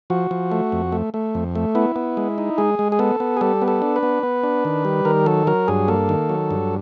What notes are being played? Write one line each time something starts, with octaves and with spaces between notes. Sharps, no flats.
F3 F#4
F3
A3
F2
A3
A3
F2
A3
B3 E4
B3
G#3
D#4
G#3 G#4
G#3
G#4
B3 A4
B3
G#4
G3 A4
B3
A4
D4
B4
B3
B3
D4
D#3
G3
D#3 A#4
F#3 A4
F#3 A#4
G2 G#4
A#3 A4
D#3
F#3
G2